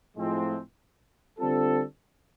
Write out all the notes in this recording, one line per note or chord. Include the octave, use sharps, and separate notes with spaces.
A2 F3 G#3 C4
D3 G3 C4 F4 A4